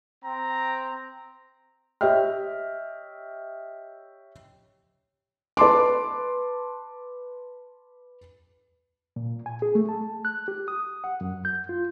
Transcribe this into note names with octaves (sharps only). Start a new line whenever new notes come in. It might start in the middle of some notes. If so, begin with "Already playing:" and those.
C4 G5 A#5
G4 C#5 D#5 E5 G5 F6
B4 A5 C6 D6
A#2
G#5
G#4
A3
A5
F#6
G4
D#6
F#5
F#2
G6
F4